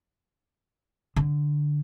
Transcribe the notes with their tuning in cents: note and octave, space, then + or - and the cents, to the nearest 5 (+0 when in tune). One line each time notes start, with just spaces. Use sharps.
D3 +0